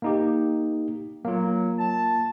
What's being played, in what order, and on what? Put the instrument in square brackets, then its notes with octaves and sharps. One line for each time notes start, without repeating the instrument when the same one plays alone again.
[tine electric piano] A#3 D#4 G4
[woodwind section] F#3 [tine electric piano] A#3 F4
[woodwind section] A5